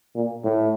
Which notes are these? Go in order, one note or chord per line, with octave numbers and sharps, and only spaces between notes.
A#2
A2